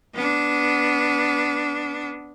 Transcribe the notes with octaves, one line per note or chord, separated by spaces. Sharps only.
B3 D4